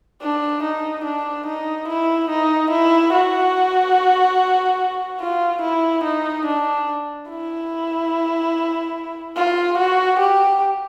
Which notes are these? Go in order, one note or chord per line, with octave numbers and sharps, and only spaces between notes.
D4
D#4
D4
D#4
E4
D#4
E4
F#4
F4
E4
D#4
D4
E4
F4
F#4
G4